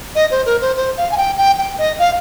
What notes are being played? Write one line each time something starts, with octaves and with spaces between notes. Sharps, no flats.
D#5
C5
A#4
C5
C5
F5
G#5
G5
G5
G5
D#5
F5